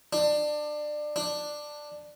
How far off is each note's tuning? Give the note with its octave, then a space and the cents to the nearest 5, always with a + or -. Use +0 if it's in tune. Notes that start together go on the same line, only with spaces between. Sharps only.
D4 +25
D4 +10